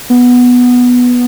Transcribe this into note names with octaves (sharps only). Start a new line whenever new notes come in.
B3